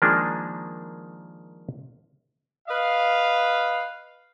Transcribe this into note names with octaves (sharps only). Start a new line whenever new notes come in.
D#3 F3 G#3 A#3 D4 G#4
B4 D#5 F5